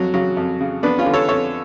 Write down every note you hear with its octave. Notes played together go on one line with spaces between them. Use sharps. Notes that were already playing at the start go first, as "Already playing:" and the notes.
Already playing: F2 F#3
C#3 F#3
F2
C#3
F2 B3 D4
C#4 F4
D3
A4 C#5
F2 A4 C#5